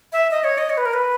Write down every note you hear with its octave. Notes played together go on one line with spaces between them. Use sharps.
E5
D#5
C#5
D#5
C#5
B4
A#4
B4